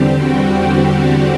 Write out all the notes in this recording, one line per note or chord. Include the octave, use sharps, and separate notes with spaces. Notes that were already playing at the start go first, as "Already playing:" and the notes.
Already playing: E2 D3 G3 C4 G4
F#4
G4